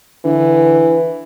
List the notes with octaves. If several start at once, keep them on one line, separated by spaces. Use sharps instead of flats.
D3 E3